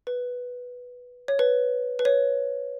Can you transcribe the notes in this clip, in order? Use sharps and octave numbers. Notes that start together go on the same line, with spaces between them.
B4
C#5
B4
B4
C#5